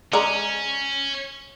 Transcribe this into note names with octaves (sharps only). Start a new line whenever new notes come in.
G#3 C#4 D5 A#5